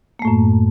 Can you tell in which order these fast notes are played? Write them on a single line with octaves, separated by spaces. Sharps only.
A#3 A3 A2 F#2